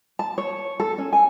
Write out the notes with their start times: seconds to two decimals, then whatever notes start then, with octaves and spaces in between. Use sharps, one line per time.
0.19 A5
0.38 C#5
0.80 A4
0.98 C#4
1.13 G#5